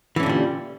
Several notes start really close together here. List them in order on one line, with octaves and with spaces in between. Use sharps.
E3 C#4 D3 A#2 G3